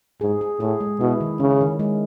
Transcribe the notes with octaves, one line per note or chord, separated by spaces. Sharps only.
G#2 G#4
G#4
A2 G#4
G#3
B2 E4
D#3
C#3 C#4
D#3
G#3